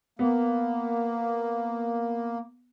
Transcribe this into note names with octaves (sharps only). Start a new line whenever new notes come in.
A#3 B3